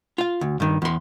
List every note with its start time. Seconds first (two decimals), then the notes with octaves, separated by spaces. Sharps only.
0.18 F4 F5
0.41 D2
0.60 G2 D#3
0.82 E2 C6